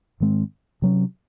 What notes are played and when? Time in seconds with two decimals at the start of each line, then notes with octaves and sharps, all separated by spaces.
0.20 G#2 D#3 G#3 C4
0.82 C3 F#3 C#4